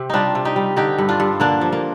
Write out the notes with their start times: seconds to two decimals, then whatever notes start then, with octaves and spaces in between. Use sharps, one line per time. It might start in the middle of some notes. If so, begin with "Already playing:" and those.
Already playing: C3 G4
0.10 G3 D4 D#4 F4
0.35 C3
0.45 D#4 G4
0.56 G3
0.76 D3 D#4 G4
0.98 G2
1.09 D4 F4
1.20 G2
1.40 D3 A#3 D4
1.61 F3
1.73 A#3